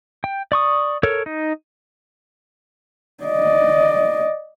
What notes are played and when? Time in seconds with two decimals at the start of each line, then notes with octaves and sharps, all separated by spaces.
0.24 G5
0.52 D5 C#6 D#6
1.03 A4 A#4 C#5
1.26 D#4
3.24 D5 D#5